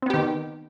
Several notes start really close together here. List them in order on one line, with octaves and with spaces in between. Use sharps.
C4 B3 G4 D#3